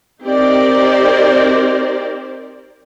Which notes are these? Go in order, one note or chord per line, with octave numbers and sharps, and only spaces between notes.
C4 D#4 G4 A#4 C5 D5